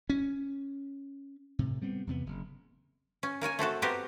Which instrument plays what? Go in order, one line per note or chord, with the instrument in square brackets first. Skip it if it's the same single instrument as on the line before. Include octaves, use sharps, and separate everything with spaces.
[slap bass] C#4
A2 C3
G3 B3 C4
E2 C3 B3
F#1
[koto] C#4
A#3 A#4 C#5 G#5
A3 C4 F#4 A4
B3 C4 F#4 G4 A#4